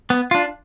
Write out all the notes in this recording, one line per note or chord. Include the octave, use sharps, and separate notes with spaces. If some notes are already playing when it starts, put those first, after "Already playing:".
B3
D4 F4